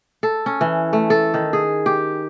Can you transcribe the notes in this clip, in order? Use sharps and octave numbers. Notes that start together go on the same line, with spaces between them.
A4
C#4
E3
A3
A4
D#3
G#4
G4